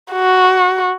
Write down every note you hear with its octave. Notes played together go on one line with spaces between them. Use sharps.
F#4